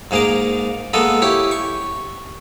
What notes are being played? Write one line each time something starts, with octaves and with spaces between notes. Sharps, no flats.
G#2 A#3 G#4 A#5 D6
G#3 A#3 B3 A4 D#5
E4 G4 C#5
C#6